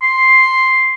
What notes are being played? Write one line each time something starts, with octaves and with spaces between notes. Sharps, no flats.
C6